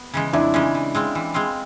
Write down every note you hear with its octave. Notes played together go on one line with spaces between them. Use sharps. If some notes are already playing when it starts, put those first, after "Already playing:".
Already playing: B3
C#3 E3 G#3
F2 D4 E4
C#3 E3 G#3
E3
G#3 C4 F4
E3
G#3 C4 F4